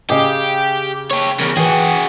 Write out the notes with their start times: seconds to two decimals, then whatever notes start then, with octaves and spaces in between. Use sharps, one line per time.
0.10 C#3 G4 D#5
1.11 G4 C#5
1.39 E2 C#3 A#4
1.57 E3 F#4 G#4 G5